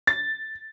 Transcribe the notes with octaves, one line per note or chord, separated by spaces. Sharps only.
A6